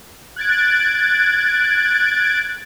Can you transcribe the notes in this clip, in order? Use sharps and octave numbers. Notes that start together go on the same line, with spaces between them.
F#6 G#6 A6 D7